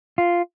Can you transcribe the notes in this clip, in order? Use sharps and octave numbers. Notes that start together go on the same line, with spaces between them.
F4